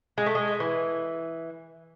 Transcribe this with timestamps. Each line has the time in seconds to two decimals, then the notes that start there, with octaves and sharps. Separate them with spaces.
0.18 G#3
0.26 A3
0.35 G#3
0.60 E3